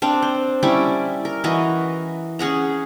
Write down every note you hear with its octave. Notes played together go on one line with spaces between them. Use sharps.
C4 D4 F5
C5
G3 C#4 E4 D5
A#4
E3 F#4 D#5 A#5
C#4 G#4 F#5 A#5